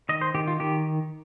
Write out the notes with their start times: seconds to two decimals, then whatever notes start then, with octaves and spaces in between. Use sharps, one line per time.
0.09 D#3 D#5
0.21 C5
0.34 D#3 G4
0.47 F4
0.60 D#3 G4